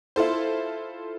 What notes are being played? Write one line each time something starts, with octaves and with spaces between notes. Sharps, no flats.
E4 F4 A4 C5